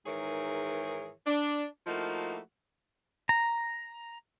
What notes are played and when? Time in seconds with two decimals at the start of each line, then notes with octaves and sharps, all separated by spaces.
0.06 G#2 D#3 E3 G#4 A#4 C#5
1.26 D4
1.86 F3 A3 A#3 D#4 E4 F#4
3.29 A#5